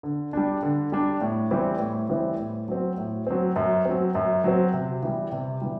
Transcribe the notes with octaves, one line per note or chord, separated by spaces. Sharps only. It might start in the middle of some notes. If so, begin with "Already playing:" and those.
D3
G3 D4
D3
G3 D4
A2
E3 G3 C4 E4
A2
E3 G3 C4 E4
A2
F#3 C4
A2
F#3 C4
F#2
F#3 C4
F#2
F#3 C4
C3
E3 G3
C3
E3 G3